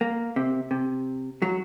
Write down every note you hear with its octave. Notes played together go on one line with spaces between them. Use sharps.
A#3
C3
C3
F#3